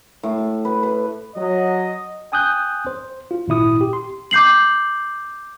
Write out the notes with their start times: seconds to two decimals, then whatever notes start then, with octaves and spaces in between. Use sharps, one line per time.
0.23 A2
0.38 E5
0.65 B4
0.83 B4
1.36 F#3 D#5
2.32 G5 G#5 D#6 F#6 G6
2.87 C5
3.31 F4
3.48 G#1 A#2 E4 D#6
3.81 G4
3.93 C6
4.31 D6 G6 C7 F#7